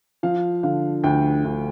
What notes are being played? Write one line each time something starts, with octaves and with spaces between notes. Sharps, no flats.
F3 F5
D3 F5
D2 G5
D2